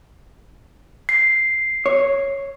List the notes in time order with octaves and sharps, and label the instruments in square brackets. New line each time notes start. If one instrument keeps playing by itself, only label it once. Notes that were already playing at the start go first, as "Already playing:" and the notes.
[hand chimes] C7
[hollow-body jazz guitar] C#5